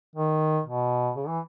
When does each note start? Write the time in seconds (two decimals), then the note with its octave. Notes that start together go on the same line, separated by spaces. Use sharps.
0.16 D#3
0.66 B2
1.16 C#3
1.28 E3